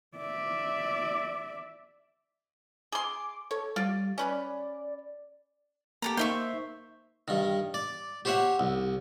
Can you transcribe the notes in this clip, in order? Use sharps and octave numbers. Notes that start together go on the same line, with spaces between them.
D5 E5
G#4 C6 D6
A4 C#5
G3 F4 D5
C#4 B4 D5 B5
A#3 G4 A4 A#5
A#3 D#4 C5 E5 C#6
G2 D#3
D5
G4 C5 C#5 E5 F#5
C2